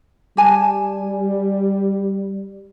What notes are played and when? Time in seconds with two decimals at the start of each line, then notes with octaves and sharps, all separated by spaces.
0.37 G3 G4 G#5 A5